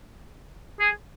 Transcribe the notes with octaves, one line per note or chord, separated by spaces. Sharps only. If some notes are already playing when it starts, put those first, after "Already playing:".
G#4